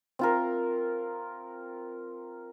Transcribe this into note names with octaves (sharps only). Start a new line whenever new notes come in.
C4 F4 A#4